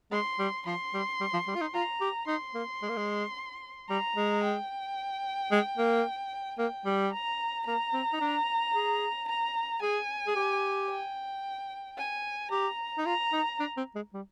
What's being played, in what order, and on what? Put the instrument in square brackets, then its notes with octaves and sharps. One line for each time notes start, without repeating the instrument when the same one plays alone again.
[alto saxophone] G#3 [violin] C6
[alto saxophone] G3
[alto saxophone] F3 [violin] C6
[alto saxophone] G3
G3
F3
G3
F4
D#4
[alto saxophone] F4 [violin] A#5
[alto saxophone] G4
[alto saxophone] D#4 [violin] C6
[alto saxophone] A#3
G#3
A#3
G#3
[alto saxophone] G3 [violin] A#5
[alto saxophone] G#3
[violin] G5
[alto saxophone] G#3
A#3
[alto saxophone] A#3 [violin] G5
[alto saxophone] G3
[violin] A#5
[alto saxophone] A#3 [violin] A#5
[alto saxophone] C4
D#4
D4
G#4
[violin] A#5
[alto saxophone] G#4 [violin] G#5
[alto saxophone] G#4
G4
[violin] G5
G#5
[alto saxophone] G4 [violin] A#5
[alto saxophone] D#4
[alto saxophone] F4 [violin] A#5
[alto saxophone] D#4
D4
C4
G#3
G3